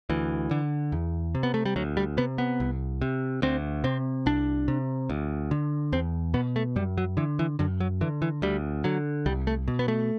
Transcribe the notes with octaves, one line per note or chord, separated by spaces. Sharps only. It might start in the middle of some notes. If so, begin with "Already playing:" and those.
D2 E3
D3
E2
C3
B3
A3
G3
D2 F#3
G3
C3 B3
B3
C2
C3
D2 C4
C3 C4
C2 D4
C3
D2
D3
E2 C4
B2 B3
A3
F#2 G3
F#3
D3 E3
E3
F#2 D3
F#3
D3 E3
E3
D2 G3
D3 F#3
C2 G3
A3
B2
B3
A3